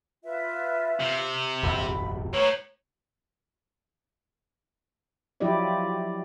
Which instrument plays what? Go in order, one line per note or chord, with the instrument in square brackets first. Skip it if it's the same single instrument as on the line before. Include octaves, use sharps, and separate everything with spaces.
[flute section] F4 B4 E5
[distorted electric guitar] C3
[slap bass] D#1 G#1 F2 [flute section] B5
[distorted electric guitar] A2 [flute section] B4 A#5 C#6 [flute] C#5
[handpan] F3 F#3 E4 G4 D5 D#5